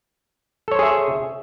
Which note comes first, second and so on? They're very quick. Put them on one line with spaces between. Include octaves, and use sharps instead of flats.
A4 C#5 C5 G#4 E5